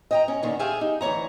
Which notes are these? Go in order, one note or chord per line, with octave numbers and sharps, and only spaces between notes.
D#5 G5 A#5
C#4
A#2 D3 D#3
G4 G#4 E5 F5 G#5
D#4
D2 E3 F#3 C#5 A#5